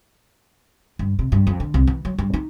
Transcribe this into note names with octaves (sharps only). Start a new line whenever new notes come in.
G2
C3
G2
F2
D3
C2
E3
F#3
G2
D#4